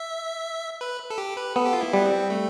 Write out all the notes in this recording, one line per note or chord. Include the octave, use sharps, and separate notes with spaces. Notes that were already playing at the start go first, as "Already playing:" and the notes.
Already playing: E5
B4
A4
G4
B4
B3 A4
G4
F4
E4
G3 B3
C4
A3